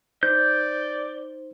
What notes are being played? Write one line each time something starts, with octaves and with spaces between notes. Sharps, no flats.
D#4 C5 D5 G6